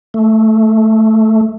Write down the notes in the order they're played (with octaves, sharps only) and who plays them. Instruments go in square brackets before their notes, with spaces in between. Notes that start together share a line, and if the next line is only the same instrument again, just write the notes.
[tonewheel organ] A3